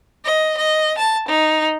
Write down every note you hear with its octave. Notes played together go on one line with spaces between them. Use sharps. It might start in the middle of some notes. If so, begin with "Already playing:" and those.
D#5
D#5
A5
D#4